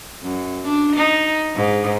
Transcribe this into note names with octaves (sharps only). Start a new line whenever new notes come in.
F#2
D4
D#4
G#2